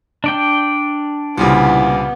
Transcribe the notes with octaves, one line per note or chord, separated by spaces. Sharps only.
D4 D5 G5
C2 A#2 C#3 B3 E4